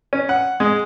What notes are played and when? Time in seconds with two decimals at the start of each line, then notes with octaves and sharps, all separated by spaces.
0.13 C#4
0.29 F#5
0.60 G#3